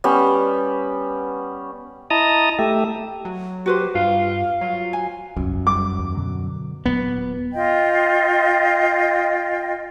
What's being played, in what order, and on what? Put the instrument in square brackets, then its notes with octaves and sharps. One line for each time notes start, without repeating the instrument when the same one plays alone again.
[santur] G3 B3 C#4
[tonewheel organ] E4 D#5 A5 A#5 D#6
A3 G4 E5
[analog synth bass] F#3
[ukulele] F#4 B4 C5 [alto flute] G4
[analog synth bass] G2 [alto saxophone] F4 [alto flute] F5
[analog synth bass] F#3 [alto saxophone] F4
[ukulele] G#5
[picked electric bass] E1 C2 [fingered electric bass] F#2
[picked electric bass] F1 G3 [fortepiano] D6
[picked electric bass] D#2
B2 D3 F#3
[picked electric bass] D#1 A#2 F#3 [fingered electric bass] B3
[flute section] F4 D#5 G5